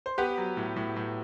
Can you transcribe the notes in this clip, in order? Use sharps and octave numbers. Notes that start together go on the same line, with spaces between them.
C5
B3 G4 B4
F#3
A2
A2
A2